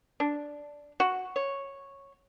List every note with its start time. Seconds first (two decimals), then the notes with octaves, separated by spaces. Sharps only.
0.20 D4
1.00 F#4
1.36 C#5